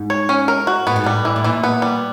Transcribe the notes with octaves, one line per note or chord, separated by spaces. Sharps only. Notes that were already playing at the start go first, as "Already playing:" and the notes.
Already playing: G#2
C#5
C#4
A#4
F#4
A2 B3
G#2
A2 G3
E3
A2
A#2 E3
B3
G3